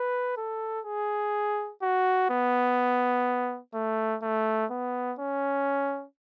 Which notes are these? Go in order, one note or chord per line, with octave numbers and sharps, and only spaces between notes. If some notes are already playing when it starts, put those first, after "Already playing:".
Already playing: B4
A4
G#4
F#4
B3
A3
A3
B3
C#4